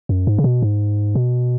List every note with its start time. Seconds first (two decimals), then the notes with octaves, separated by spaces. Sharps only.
0.09 F#2
0.27 G#2
0.38 C#3
0.44 B2
0.63 G#2
1.15 B2